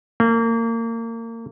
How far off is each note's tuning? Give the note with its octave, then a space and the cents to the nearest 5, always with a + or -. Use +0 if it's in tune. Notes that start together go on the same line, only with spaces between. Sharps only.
A#3 -30